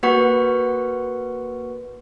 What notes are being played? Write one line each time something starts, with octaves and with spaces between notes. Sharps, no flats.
A#3 F#4 B4 F#5 C#6